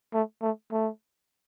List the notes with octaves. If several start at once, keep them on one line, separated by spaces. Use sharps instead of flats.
A3
A3
A3